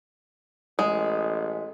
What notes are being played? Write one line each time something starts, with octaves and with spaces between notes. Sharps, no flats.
A1 G#3